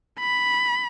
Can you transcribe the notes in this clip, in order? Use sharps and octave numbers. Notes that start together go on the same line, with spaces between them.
B5